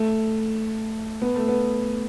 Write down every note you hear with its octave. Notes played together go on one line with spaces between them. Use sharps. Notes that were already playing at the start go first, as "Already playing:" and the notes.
Already playing: A3
B3
A3
B3